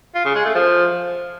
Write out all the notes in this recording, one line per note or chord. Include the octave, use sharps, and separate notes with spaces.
F4
C#3
G#3
A3
F3